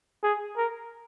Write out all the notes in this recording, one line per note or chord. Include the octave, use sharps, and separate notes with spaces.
G#4
A#4